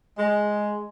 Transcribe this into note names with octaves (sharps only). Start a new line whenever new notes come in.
G#3